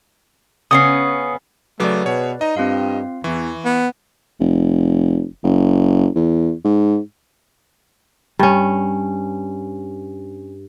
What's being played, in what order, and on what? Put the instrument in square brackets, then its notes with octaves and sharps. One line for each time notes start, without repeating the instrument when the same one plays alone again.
[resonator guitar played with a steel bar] C#3 B3 C#4 [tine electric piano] D#6 C7
[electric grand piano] C#3 F#3 D6 [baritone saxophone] A3 [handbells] B4 D5
[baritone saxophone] B2 [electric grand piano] G#4 C#5
[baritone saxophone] D#4 [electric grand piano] D#5
[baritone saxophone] G2 [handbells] C4 F4 F5
[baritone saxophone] E2 [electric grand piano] E3 [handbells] C#6
[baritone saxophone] B3
[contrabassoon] F1
F#1
E2
G#2
[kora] G2 C#4